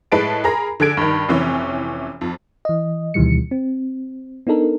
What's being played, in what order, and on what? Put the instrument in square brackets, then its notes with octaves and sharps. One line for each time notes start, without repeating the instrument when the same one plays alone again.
[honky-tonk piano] A2 G#3 B4 A5 D7
G#4 A#4 A#5 B5
D3 G#4 A4 G#6 D7
G2 D#3
F1 C3 E3 C#4
F2
[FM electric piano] E3 D#5
D2 B2 D#3 E3 G3 C#7
C4
B3 D4 D#4 A4 A#4